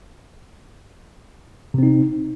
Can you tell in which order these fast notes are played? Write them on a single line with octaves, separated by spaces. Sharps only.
C3 C4 D#4